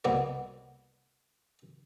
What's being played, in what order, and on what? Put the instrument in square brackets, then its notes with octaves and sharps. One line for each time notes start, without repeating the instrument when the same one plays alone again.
[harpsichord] C2 B2 A#3 B3 D5